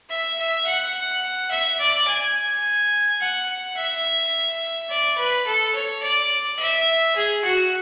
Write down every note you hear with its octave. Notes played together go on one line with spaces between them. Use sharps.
E5
E5
F#5
E5
D5
G#5
F#5
E5
D5
B4
A4
C#5
D5
E5
G#4
F#4